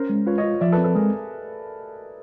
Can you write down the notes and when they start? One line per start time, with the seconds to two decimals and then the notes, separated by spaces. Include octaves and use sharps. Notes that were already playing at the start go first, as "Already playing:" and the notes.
Already playing: C#4 A#4 C5
0.09 G#3
0.26 F4 B4 C#5
0.38 C#5 D#5
0.44 F4
0.61 F3 D5 E5
0.72 A4 B4
0.78 C4
0.84 A4 B4
0.95 G#3 G#4 A#4